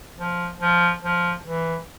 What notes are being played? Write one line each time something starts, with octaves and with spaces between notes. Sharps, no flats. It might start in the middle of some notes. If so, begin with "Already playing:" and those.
F3
F3
F3
E3